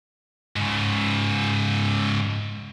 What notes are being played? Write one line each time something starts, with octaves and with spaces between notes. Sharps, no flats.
G#2 C#3